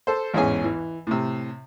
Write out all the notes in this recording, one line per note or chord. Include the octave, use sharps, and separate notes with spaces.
A4 C5
A1 E2 G#2 C#4 G#4 G#5
E3
A2 C3